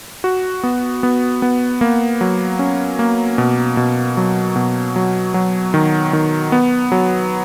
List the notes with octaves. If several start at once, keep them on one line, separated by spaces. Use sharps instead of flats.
F#4
B3
B3
B3
A#3
F#3
C#4
A#3
B2
B2
F#3
B2
F#3
F#3
D#3
D#3
B3
F#3